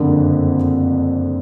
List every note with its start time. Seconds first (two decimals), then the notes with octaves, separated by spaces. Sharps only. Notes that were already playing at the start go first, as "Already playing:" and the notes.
Already playing: F#1 F2 D3